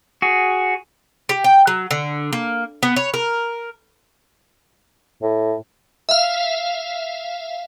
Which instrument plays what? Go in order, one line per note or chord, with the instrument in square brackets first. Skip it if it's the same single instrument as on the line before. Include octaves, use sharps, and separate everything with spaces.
[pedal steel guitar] F#4 G#4
[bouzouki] G4
G5
F#3
D3
A#3
B3
C#5
A#4
[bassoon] A2
[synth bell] E5 F5